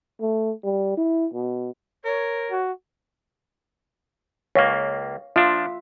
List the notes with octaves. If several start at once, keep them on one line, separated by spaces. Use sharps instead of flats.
A3
G3
E4
B2
A#4 C#5
F#4
C#2 A#3 C#5 F5
F3 D4 F4 E5